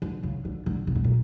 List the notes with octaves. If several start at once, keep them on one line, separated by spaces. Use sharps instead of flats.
D3
C#3
D3
D3
C3
B2
A#2